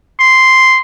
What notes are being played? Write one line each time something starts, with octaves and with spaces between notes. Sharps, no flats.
C6